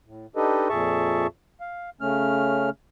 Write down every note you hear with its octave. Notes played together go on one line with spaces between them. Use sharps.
A2
D4 D#4 G4 A4 B4 D#5
F2 A#2 G#4 E5 A5 C#6
F5
C#3 A3 C#4 F6